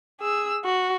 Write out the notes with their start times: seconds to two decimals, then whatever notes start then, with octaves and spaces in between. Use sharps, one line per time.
0.21 G#4 E6
0.65 F#4